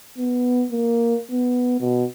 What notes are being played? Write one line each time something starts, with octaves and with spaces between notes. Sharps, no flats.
B3
A#3
B3
B2